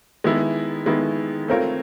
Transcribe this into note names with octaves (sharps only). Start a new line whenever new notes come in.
D#3 G#3 B3 E4
D#3 G#3 B3 E4
A3 C4 F4 A#4 C#5